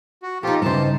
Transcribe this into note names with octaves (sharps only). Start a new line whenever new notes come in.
F#4
F3 D#4 F4 G4 A4
G2 C#3 E3 D#4 C5 A5